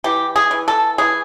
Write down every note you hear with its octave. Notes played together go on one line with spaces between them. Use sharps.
E3 G4
G#4
E3
A4
E3 G#4